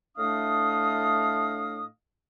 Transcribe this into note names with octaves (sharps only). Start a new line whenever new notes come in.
A2 A3 D4 D#5 F5 D#6